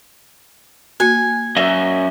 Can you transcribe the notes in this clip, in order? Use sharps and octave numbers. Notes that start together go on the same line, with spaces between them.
A#3 F#4 G#5
F#2 D#5 E5